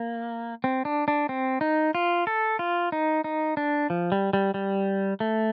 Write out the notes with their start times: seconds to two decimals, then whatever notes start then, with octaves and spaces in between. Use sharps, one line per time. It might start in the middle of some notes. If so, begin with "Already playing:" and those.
Already playing: A#3
0.64 C4
0.85 D4
1.08 D4
1.29 C4
1.61 D#4
1.95 F4
2.27 A4
2.59 F4
2.92 D#4
3.24 D#4
3.57 D4
3.90 F3
4.12 G3
4.33 G3
4.54 G3
5.20 A3